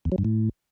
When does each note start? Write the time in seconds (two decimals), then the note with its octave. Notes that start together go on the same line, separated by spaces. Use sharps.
0.05 E2
0.12 F#3
0.18 G2
0.25 A2